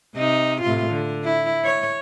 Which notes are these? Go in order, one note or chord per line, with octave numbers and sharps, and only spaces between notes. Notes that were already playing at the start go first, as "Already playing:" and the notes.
C3 D#4
A2 C3 F4
D3
E4
C#5